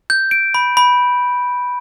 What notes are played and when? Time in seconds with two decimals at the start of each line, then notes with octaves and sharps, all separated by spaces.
0.10 G6
0.31 D7
0.54 B5
0.77 B5